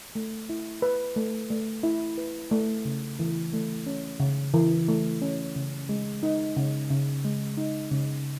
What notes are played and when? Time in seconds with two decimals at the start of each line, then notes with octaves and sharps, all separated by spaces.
0.15 A3
0.49 E4
0.82 B4
1.16 A3
1.50 A3
1.83 E4
2.18 B4
2.51 A3
2.85 C#3
3.19 E3
3.53 A3
3.87 C#4
4.20 C#3
4.54 E3
4.88 A3
5.22 C#4
5.56 C#3
5.89 G#3
6.23 D#4
6.57 C#3
6.91 C#3
7.25 G#3
7.57 D#4
7.92 C#3